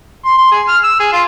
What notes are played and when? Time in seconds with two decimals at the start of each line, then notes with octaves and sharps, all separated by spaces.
0.25 C6
0.38 C6
0.51 G#4
0.68 F6
0.83 E6
1.00 G#4
1.13 F4